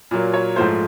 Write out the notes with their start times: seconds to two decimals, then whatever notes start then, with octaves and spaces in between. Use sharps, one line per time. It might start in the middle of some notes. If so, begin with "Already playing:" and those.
0.11 A#2 F#3 A#3
0.33 C#5
0.56 G#2 F3 A3 C5